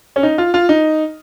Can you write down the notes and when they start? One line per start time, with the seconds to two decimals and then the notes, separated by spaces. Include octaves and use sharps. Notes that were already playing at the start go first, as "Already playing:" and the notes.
0.16 C#4
0.23 D#4
0.38 F4
0.54 F4
0.69 D#4